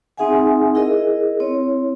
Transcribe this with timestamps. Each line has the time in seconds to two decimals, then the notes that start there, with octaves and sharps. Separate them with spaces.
0.17 C4 D#4 G#4 E5 F#5 G#5
0.75 E4 G#4 A#4 D#5
1.40 C4 E4 C#5